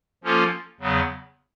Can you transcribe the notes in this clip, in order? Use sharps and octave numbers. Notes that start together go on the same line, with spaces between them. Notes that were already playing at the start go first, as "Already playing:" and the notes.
F3 A#3 C#4 F4 A4
E2 C#3 F#3 B3